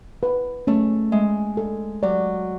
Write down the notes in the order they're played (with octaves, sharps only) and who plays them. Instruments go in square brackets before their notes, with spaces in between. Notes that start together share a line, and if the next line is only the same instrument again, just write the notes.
[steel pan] B4
[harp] A3 [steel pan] C#4
[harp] G#3 [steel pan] E5
[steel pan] A4
[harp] F#3 [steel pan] D5